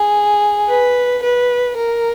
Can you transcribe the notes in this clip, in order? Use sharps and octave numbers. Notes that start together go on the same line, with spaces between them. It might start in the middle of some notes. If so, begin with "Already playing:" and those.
Already playing: G#4
B4
B4
A#4